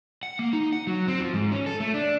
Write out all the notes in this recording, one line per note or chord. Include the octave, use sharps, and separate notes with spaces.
F#5
A#3
D#4
F#5
F#3
C4
F3
G#2
C#4
A4
A3
D4